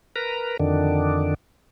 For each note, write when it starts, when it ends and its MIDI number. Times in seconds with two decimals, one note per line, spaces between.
0.16 0.57 70
0.16 0.57 71
0.16 0.57 82
0.59 1.34 41
0.59 1.34 50
0.59 1.34 51
0.59 1.34 62